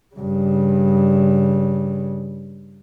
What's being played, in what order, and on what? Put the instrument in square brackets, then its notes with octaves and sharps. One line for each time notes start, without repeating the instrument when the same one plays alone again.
[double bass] G2 C#3